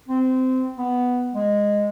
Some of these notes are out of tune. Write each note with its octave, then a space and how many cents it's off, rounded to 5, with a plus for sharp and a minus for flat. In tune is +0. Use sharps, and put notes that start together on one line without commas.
C4 -20
B3 +0
G#3 -10